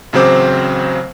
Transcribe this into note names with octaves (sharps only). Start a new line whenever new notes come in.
A1 C#3 F#3 C4 C5 D6